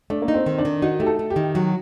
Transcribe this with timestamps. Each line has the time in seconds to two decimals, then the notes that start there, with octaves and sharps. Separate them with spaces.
0.10 A3 D4
0.22 A#3
0.28 D#4
0.34 C4
0.46 D#3
0.58 D4
0.65 D#3
0.82 D#4 F#4
1.00 A3 G4
1.06 A4
1.19 A3
1.30 G4
1.36 D#3
1.55 F#3 F#4